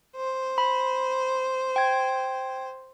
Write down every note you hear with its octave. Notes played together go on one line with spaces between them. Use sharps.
C5
B5
G5 G#6